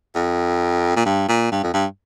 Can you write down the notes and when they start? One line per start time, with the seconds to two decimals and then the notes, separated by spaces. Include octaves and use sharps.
0.15 F2
0.96 A#2
1.06 G2
1.28 A#2
1.51 G2
1.63 F2
1.73 G2